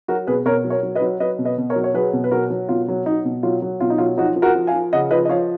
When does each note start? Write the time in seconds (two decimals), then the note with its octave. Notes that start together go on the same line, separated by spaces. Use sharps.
0.08 F#3 F#4 A#4
0.27 B2 G#4 B4
0.45 B2 A#4 C#5
0.65 F#3
0.70 A#4 C#5
0.83 F#3
0.95 B4 D#5
1.02 F#3
1.20 F#3 B4 D#5
1.39 B2
1.45 B4 D#5
1.58 B2
1.70 A#4 C#5
1.76 F#3
1.84 C#5
1.94 F#3 G#4 B4
2.13 B2
2.24 B4
2.31 F#3 F#4 A#4
2.50 F#3
2.69 B2 F4
2.88 F#3
3.06 F#3 D#4
3.25 B2
3.43 F#3 F4
3.62 F#3
3.80 B2 F4
3.90 D#4
3.98 F#3 F4
4.17 F3 D#4 F#4
4.36 F3
4.42 F#4 A#4
4.55 F3
4.67 F5 G#5
4.74 F3
4.93 C#3 D#5 F#5
5.11 F3 B4 D#5
5.25 D#5
5.29 F3 C#5 F5